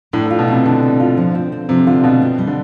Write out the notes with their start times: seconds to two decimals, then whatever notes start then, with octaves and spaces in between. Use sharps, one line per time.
0.13 A2 D4
0.26 A2 F4
0.39 B2
0.48 C3 A4
0.65 D3 D4
0.83 A4
1.00 F4
1.17 F3
1.35 C4
1.52 C4
1.69 C3 F3
1.87 D3 F4
2.03 B2 F4
2.22 C4
2.38 G3
2.47 D3